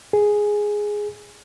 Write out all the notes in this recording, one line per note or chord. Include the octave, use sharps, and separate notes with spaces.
G#4